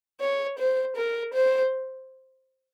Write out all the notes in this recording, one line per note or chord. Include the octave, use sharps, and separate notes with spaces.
C#5
C5
A#4
C5